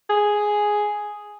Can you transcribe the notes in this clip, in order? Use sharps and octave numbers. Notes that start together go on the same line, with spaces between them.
G#4